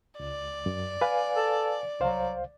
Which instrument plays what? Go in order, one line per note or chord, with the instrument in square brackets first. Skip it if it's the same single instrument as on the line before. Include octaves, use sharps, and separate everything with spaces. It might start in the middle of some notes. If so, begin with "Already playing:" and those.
[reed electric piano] C#2 [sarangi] D5
[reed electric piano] F#2
B4 F5 G#5
[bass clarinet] A4
[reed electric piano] C2 C5 F5 [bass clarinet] F#3